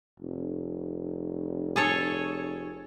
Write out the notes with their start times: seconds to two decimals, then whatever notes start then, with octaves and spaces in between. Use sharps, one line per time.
0.20 F1
1.76 G#4 A4 C#5